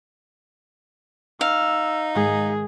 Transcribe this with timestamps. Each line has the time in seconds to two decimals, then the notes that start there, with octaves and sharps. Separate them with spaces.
1.41 D#4 F5 E6
2.15 G#2 D#3 G#3 G#4